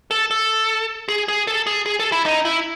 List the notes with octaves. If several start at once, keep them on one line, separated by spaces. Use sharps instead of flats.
A4
A4
G#4
G#4
A4
G#4
G#4
A4
E4
D#4
E4